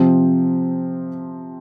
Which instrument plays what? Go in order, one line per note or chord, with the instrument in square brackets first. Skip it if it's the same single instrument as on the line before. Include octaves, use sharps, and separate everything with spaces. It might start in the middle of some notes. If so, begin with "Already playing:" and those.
Already playing: [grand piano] C3 F3 C4